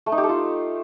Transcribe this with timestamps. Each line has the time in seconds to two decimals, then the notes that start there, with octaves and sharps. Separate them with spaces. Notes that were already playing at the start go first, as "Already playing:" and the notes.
0.06 A3
0.12 D#4
0.18 G4
0.23 A4
0.29 F4